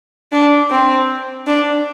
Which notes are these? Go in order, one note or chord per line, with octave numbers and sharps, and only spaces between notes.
D4
C4
D4